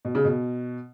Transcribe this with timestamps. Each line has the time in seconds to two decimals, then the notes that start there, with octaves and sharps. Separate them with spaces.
0.05 B2
0.15 C#3
0.25 B2